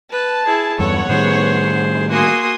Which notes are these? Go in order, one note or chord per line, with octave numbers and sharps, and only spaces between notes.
B4 A5
E4 G#4
E2 G2 B3 A4 C#5 F#5
A2 D#3 G3 G#4 C5
A#3 F#4 G#5 C6 D#6